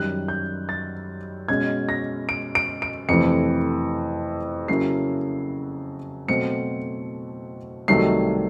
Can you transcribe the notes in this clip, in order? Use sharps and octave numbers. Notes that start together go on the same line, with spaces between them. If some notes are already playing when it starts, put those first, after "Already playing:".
Already playing: F#2 D#3 G3 F#6
G6
A6
B2 G#3 C#4 G#6
A#6
D7
D7
D7
F2 C3 E3 A3 C#7
C#3 F#3 A#3 C#4 E4 C7
B2 F#3 A3 C4 C#7
C2 C3 D#3 F#3 A3 C7